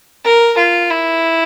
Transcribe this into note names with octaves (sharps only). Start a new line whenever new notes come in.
A#4
F4
E4